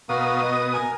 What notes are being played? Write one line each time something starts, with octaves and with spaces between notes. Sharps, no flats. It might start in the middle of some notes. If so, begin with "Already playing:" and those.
B2 F#4 A#4 F5 D#6
D#5
A#4 G#5